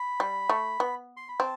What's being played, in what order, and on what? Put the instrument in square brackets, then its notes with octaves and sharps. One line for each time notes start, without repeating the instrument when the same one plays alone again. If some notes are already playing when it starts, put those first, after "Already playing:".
Already playing: [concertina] B5
[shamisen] G3
A3
B3
[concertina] C6
B5
[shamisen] C4 [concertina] A5